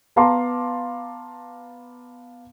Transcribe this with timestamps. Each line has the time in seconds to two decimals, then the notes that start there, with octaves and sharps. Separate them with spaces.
0.16 B3 F5 A5 A#5 C6 D6